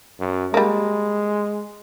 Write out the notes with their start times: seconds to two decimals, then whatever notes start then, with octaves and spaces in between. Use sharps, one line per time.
0.20 F#2
0.54 G3 G#3 A#3